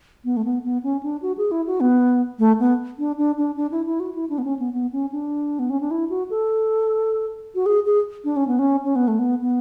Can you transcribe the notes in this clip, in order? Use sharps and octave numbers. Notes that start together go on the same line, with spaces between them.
B3
A3
B3
B3
C#4
D4
F#4
G#4
E4
F#4
B3
A3
B3
D4
D4
D4
D4
E4
E4
F#4
E4
D4
B3
C#4
B3
B3
C#4
D4
B3
C#4
D4
E4
F#4
A4
F#4
G#4
G#4
D4
C#4
B3
C#4
C#4
B3
A3
B3
B3